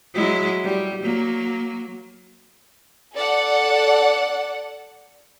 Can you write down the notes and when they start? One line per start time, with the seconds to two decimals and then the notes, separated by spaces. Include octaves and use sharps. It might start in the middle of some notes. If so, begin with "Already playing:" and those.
0.14 F#3 G#3 E4
0.64 G3
1.03 F#3 A#3
3.14 A4 D5 F#5